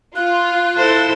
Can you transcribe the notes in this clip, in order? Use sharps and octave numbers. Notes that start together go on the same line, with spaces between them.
F4 F#6
E4 A4 C5